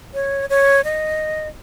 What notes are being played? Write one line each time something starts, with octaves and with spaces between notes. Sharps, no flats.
C#5
C#5
D#5